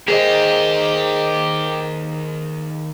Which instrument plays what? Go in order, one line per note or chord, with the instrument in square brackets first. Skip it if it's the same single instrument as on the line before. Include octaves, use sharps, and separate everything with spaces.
[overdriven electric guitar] D#3 A#3 [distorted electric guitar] G4 [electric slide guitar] G#4 C5 D#5